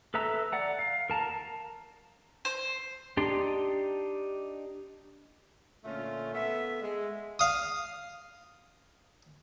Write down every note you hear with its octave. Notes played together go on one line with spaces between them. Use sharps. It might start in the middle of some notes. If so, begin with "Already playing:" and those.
A4 B4 E5 A#5 E6
D5 F#5 A#5
F5
A#4 A5 A#5
C5
D4 D#4 G4 C6
A#2 D3 A3 C#4 F4
B3 A4 E5
G#3
F5 D#6